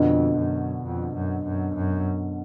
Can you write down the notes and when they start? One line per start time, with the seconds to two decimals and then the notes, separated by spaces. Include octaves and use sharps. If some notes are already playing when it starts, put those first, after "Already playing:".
Already playing: F2 B2 D3
0.36 F#2
0.83 F2
1.14 F#2
1.44 F#2
1.76 F#2